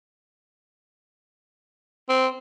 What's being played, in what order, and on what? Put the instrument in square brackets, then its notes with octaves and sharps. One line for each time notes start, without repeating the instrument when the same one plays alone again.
[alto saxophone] C4